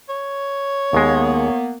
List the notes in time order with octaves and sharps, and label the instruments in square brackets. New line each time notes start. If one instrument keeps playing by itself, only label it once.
[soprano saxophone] C#5
[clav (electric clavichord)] D#2 G#3 [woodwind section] A#3 B3